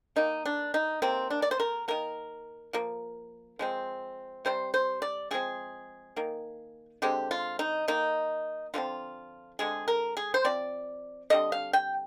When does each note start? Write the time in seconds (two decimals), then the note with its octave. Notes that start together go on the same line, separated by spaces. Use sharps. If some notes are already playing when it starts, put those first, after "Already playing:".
0.16 D#3 A#3 D#4
0.46 D4
0.74 D#4
1.02 C3 D#3 A#3 C4
1.30 D4
1.42 D5
1.51 C5
1.60 A#4
1.88 D#3 A#3 A#4
2.73 F3 A#3
3.59 F3 G#3 C4
4.45 C3 G3 C4 C5
4.74 C5
5.02 D5
5.31 D3 F3 G#3 C4 G#4
6.16 D#3 A#3
7.02 D3 G#3 C4 G4
7.31 F4
7.59 D#4
7.88 D#3 A#3 D#4
8.74 D3 F3 G#3 C4 F4
9.59 D3 G#3 C4 G#4
9.88 A#4
10.17 G#4
10.34 C5
10.45 F3 C4 D5
11.30 D3 G3 C4 D#5
11.52 F5
11.73 G5